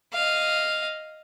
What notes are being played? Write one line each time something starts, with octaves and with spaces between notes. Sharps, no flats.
D#5 F5